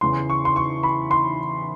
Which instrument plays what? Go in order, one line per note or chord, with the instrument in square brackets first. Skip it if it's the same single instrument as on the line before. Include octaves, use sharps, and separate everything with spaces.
[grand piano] E2 C#3 E3 C6
C#6
C6
C#6
B5
C6